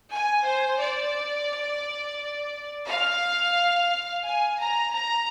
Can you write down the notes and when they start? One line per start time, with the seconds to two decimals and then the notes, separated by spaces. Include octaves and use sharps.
0.11 G#5
0.45 C5
0.80 D5
2.87 F5
4.26 G#5
4.60 A#5
4.95 A#5